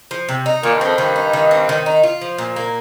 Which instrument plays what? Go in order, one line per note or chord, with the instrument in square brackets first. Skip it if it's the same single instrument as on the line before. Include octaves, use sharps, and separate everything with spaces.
[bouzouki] F3
C3
D#4
[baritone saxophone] A#2 [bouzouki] D#3
[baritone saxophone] G2
[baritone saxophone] F2 [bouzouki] C4
[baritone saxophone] G2 [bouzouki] D#3
[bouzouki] D#4
D#3
C4
D#3
D#4
F4
F3
A#2
A#3